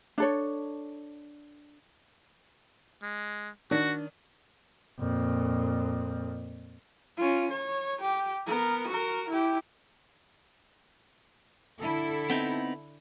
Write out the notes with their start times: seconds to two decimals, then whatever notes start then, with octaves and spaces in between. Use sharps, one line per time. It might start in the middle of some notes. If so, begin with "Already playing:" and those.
0.18 D4 A4 C#5
3.03 G#3
3.71 D#3 D4 F#4
4.99 F2 A#2
7.17 C#4 F4
7.50 C#5
8.01 G4
8.46 B3 A#4
8.87 F#4 A#4
9.29 E4 G4
11.80 D3 E4 A4
12.30 B3 C4 D#4